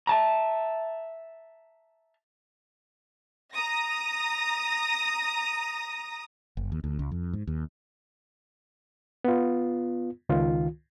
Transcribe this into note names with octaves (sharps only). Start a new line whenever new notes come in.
E5 A5 A#5
A#5 D#6 A#6
F#1
D#2
D2
C#2
F2
G#2
D#2
B3 F4
C#2 D#3 F4